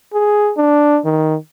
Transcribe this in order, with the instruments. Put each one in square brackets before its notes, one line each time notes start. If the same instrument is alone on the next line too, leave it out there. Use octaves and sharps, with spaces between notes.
[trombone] G#4
D4
D#3